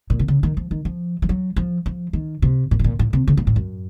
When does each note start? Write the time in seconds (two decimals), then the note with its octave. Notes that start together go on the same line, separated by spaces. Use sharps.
0.10 A#2
0.19 C3
0.28 C#3
0.43 D#3
0.57 F3
0.71 D#3
0.85 F3
1.22 F3
1.29 F#3
1.56 F3
1.86 F3
2.13 D#3
2.42 C3
2.71 A#2
2.79 A2
2.84 A#2
2.99 A2
3.13 C3
3.27 C#3
3.37 A#2
3.47 A2
3.56 F#2